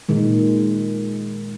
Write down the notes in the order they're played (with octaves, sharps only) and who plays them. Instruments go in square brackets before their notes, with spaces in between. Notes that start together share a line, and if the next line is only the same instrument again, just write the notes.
[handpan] A#2 D#3 G#3